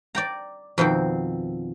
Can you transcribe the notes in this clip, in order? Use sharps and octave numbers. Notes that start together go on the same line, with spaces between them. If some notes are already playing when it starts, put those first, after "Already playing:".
D5 G5 A#5
F2 B2 D#3 C4